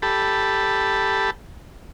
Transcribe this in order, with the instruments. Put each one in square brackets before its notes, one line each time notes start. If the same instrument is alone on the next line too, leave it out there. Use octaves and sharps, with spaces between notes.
[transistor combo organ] G4 A4 A5 B5